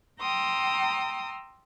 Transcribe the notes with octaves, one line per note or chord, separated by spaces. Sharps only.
G5 A#5 C6 D#6 E6